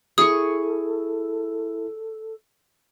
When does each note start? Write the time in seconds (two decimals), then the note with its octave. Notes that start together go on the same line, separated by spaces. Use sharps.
0.18 E4 G#4 A4 C#6 D#6